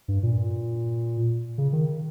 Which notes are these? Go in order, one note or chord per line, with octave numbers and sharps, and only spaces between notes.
G2
A#2
C#3
D#3